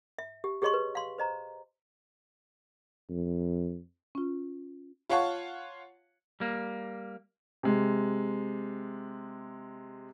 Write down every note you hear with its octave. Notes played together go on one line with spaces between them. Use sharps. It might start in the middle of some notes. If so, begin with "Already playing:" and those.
E5
G4
G4 G#4 C#5 D#5 C6 C#6
B4
F5 C6
C5 D#5 A#5
F2
C#4 F4
F4 C#5 F5 F#5 A5 C#6
G3 A#3
C3 G#3